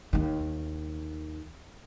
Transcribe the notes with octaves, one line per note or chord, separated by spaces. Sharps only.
D#2 D#3